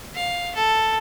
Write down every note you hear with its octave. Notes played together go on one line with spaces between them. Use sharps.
F5
A4